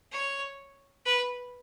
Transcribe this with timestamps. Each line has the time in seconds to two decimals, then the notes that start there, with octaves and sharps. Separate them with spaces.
0.12 C#5
1.05 B4